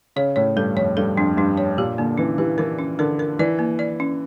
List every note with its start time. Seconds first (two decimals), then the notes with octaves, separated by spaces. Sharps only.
0.16 C#3 C#5
0.36 A2 C#5
0.56 G2 A4
0.76 F2 C#5
0.97 G2 A4
1.17 F2 D4
1.37 G2 D4
1.57 C#5
1.77 A#2 G4
1.98 D3 A#3
2.18 E3 C#4
2.38 E3 G4
2.58 E3 A#4
2.79 C#4
2.99 D3 A#4
3.19 A#4
3.39 E3 D5
3.59 A#3
3.79 D5
4.00 C#4